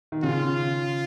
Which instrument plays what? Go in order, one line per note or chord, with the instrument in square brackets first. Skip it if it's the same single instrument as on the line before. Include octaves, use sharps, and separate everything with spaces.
[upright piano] D#3
[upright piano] C#3 [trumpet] F4